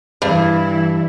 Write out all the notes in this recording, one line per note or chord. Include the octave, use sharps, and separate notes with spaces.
G2 E3 E4